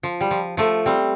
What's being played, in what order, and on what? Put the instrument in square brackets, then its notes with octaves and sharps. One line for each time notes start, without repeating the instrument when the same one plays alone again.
[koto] F3
G3
F3
F3 A3
G3 C4